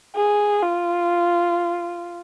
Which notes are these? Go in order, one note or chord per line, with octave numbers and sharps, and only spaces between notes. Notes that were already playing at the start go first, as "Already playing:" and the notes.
G#4
F4